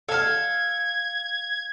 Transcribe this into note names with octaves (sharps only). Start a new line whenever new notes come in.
A4 F5 A5 F6 G#6